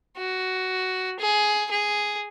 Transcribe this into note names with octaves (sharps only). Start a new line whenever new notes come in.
F#4
G#4
G#4